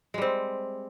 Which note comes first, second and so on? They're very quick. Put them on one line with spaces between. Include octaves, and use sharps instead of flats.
G#3 G3 C4